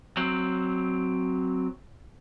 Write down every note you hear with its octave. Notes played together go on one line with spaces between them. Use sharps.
F#3 C4